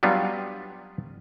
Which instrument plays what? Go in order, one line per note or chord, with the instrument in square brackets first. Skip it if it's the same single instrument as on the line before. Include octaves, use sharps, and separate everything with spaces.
[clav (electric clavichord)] F#3 G3 B3 D4 F4